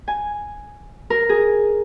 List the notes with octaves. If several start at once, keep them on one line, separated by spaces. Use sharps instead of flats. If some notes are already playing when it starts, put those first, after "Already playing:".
G#5
A#4
G#4